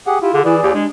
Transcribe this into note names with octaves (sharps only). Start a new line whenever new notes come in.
G4 G#4 F#5
E4 F4 G4
D3 G#4
E3 E4 G#4 D5
D#2 G4
G#3 D4